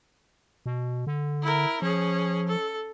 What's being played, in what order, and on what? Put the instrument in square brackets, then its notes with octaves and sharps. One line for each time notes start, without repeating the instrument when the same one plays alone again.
[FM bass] B2
D3
[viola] E4 A#4
[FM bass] F3 [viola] C#4 G#4
[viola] A4